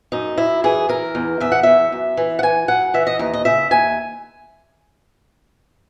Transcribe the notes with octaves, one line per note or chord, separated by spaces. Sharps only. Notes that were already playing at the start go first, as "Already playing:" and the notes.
F#2 D#4
F#2 E4
E3 G#4
E3 A#4
E2
E2 E5
F#5
E2 E5
F#2
E3
F#5
E3 G#5
F#2 F#5
E3 E5
D#5
D#2 D#5
D#5
C#3 E5
D#2 G#5